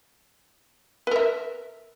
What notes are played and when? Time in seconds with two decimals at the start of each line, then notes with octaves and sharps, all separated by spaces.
1.07 B4
1.11 A#4
1.16 E5